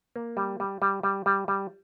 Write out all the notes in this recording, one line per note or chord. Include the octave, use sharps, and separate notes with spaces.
A#3
G3
G3
G3
G3
G3
G3